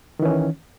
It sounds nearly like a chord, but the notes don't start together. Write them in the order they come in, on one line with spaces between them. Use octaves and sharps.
D#3 E3 C#4